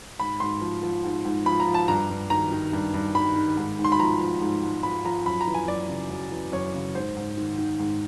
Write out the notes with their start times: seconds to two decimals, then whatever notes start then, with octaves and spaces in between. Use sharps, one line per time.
0.20 G#2 B5
0.40 G#2 C6
0.61 F3
0.83 F3
1.04 G#2
1.25 G#2
1.46 F3 B5
1.60 A#5
1.67 F3
1.74 A5
1.88 G2 A#5
2.10 G2
2.30 D#3 A#5
2.52 D#3
2.73 G2
2.94 G2
3.14 D#3 B5
3.36 D#3
3.57 G#2
3.79 G#2
3.84 C6
3.92 B5
4.00 F3 A#5
4.21 F3
4.41 G#2
4.63 G#2
4.83 F3 B5
5.05 F3 A#5
5.26 F#2 B5
5.41 A#5
5.47 E3
5.55 G#5
5.68 F#2 D5
5.89 C#3
6.10 F#2
6.31 E3
6.52 F#2 C#5
6.74 C#3
6.95 G#2 C5
7.17 G#2
7.37 D#3
7.58 D#3
7.79 G#2